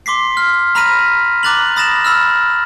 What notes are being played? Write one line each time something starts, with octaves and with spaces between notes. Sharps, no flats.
C6 D6 B6 C7
F6
A#5 B5 F6 A#6 B6 D#7
A#5 D6 F#6 A6 F7 F#7
B5 D#6 A6 A#6 E7 F7
B5 E6 F6